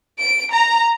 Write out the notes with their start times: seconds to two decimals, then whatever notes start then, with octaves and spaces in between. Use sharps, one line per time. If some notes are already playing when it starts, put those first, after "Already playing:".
0.20 D7
0.53 A#5